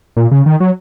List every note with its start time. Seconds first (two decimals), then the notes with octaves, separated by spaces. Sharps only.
0.17 A#2
0.31 C#3
0.46 D#3
0.60 F#3